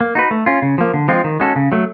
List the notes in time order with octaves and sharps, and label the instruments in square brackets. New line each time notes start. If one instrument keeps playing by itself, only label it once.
[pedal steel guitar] A#3
D#4 F#4 B4
A3
C#4 F4
C#3
F3 A#3
D3
F3 G#3 C4 F4
D#3
G#3 C#4 F#4 A4
C#3
F#3 A3